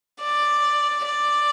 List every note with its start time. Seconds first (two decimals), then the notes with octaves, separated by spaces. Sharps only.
0.22 D5
1.05 D5